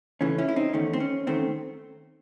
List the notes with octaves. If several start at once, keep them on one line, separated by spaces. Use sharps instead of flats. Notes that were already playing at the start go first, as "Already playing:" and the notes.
E2 C#3 E3 A3 C#4
C#4 E4
E4
C4 D#4
E2 D#3 A3 C#4
C4
C#4
E2 D#3 A3 C4